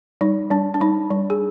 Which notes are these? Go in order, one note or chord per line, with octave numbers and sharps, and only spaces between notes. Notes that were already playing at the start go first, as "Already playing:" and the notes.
G3 D#4
G3 D4
D4
G3 D#4
G3
G#4